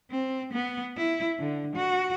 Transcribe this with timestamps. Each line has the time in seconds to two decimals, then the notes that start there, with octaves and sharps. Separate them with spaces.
0.11 C4
0.53 B3
0.97 E4
1.39 D3
1.76 F#4